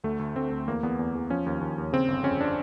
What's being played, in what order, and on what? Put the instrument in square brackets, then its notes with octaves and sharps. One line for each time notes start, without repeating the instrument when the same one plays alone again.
[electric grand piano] D2 A3
D2
D2 C4
D2
E2 A#3
E2 B3
E2
E2
F3 C#4
D#2
D#2
D#2
C#3 C4
G1
F2 C#4
D4